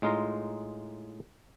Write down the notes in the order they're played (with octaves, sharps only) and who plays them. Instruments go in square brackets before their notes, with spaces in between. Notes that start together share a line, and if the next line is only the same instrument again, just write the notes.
[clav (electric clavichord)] A2 G#3 D#4 F4 F5 A#5